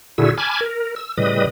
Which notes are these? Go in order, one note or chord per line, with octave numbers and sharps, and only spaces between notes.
A#2 D3 E4 F#4 G#4 E6
G#5 A5 B5 D6 F6 G#6
A#4
E6
A2 C#3 G3 B4 D#5 D#6